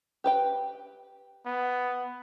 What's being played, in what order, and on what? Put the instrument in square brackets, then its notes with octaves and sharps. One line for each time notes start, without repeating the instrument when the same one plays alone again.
[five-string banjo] G4 B4 G5
[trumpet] B3